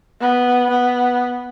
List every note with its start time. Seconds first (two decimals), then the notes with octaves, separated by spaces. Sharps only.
0.20 B3
0.70 B3